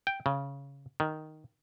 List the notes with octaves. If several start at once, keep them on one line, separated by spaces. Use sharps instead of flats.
G5
C#3
D#3